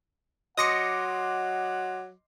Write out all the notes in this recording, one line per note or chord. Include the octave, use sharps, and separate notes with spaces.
F#3 D#5 F#5 C6 D6 D#6 A#6 C#7